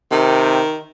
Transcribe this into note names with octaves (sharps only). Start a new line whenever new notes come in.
C3 D#3